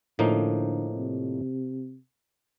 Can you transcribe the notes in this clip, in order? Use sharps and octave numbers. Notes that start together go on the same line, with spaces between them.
A2 D3 F3 A#3 D#4
C3